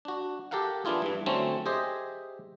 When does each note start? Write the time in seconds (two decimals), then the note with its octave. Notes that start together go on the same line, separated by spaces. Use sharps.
0.05 D4 F#4
0.51 G4 A4 A#4 F5 F#5
0.85 E3 B3 D4 E4 F4 G#4
1.02 G2 E3
1.26 D3 F#3 A3 C4 C#4
1.66 G4 G#4 C5 D#5 E5